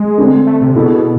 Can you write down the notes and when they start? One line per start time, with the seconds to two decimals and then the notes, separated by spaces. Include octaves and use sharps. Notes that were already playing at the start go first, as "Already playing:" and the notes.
Already playing: G#3
0.18 D3 A3 C4
0.46 A3
0.61 C3
0.75 B2 G#3 B3 E4 A4